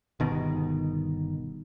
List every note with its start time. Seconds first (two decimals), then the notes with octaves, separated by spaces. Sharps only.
0.20 G1 B2 D#3